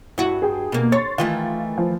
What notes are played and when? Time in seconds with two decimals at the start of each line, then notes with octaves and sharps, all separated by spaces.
0.18 G2 E4 F#4
0.42 G#4 G5
0.72 B2 A#3
0.92 C#5 C6 C#6 A6
1.18 D#3 E3 A3 F4
1.78 F3